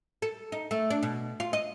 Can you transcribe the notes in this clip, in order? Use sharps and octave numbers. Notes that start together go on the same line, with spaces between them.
A4
D#4
A3
D4
B2
F4
D#5